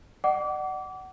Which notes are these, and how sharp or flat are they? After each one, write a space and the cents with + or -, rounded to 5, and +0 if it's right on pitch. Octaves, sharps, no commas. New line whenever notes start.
D5 +45 F#5 +25 D6 -25